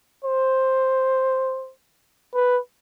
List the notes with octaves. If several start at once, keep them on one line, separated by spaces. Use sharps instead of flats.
C5
B4